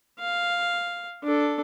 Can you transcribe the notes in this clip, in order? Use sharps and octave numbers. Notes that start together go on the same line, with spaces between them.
F5
D4 A4